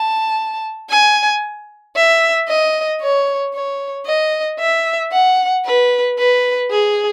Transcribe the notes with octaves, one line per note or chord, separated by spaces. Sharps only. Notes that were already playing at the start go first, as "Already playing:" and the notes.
Already playing: A5
G#5
E5
D#5
C#5
C#5
D#5
E5
F#5
B4
B4
G#4